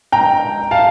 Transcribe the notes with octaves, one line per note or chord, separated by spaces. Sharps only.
G5 A#5
F5 A5